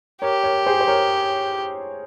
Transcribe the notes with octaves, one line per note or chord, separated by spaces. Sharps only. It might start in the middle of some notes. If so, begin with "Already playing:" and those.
G4 A#4 C#5
A#4 C#5
G#4 C5
C5
A#4 C#5